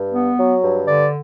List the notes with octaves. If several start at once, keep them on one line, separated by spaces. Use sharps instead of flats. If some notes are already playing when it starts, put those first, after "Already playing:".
Already playing: G2
B3
F#3
G2
D3 D5